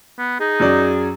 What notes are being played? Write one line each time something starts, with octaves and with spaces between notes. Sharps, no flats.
B3
D#4 G#4
F#2 F#3 D5